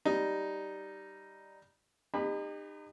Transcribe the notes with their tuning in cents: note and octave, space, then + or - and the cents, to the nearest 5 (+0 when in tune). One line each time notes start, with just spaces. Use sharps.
G3 -5 D#4 +0
D#4 -30 G4 +40 B5 +0